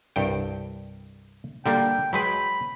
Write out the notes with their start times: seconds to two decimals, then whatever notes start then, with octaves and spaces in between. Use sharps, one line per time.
0.16 C2 G2 G5
1.66 D3 G3 A#3 G5
2.13 F#3 G#3 B4 B5